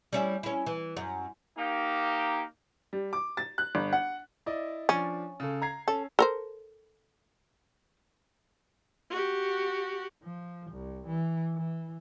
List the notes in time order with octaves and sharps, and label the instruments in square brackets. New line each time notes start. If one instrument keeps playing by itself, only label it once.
[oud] G3 C#4 E4
C#4 E4
E3
F#2
[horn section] A#3 D#4 G4
[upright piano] G3
D6
A6
F#6
G1
F#5
[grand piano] E4 D5 D#5
[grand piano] F3 D4 [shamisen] C#4
[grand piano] C#3 A4
A#5 G#6 C7
[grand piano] C#4 [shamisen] A4
[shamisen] A4 A#4 C5
[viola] F#4 G4
[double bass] F3
C2
E3
E3